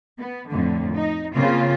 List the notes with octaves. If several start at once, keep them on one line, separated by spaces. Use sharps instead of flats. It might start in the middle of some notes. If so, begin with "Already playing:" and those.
B3
F2 A2 D3
D#4
C#3 A#3 C4 F4